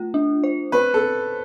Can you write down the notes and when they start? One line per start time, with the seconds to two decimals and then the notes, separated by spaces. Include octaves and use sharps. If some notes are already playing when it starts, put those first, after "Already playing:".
Already playing: A3 F4
0.14 D4
0.44 C5
0.72 C4 B4
0.94 A4